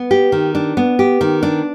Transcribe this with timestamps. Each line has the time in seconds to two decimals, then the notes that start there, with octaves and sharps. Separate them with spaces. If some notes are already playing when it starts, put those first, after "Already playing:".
Already playing: B3
0.11 G4
0.32 D#3
0.55 D4
0.77 B3
0.99 G4
1.21 D#3
1.43 D4